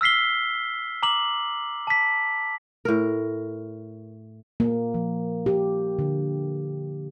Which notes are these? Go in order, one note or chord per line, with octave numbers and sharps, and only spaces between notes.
E6 F6 B6 C7 G7
A#5 D6 F#7
A5 B6
A2 A#4
A#3
F3
G4
D3